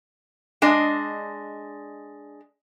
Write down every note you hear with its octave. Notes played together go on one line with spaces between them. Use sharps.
G#3 D4 D#5